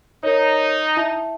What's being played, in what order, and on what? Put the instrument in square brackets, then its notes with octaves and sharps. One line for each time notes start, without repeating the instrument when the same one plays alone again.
[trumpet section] D#4 [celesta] A#4 C#5
[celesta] E4 E5 A5